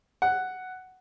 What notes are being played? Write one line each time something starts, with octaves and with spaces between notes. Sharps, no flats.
F#5